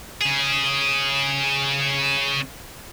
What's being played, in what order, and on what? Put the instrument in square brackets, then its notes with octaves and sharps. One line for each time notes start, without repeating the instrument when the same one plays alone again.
[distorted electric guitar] C#3 G#4